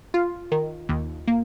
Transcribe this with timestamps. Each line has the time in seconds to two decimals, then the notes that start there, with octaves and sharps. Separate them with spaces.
0.14 F4
0.52 D#3
0.89 D#2
1.28 A#3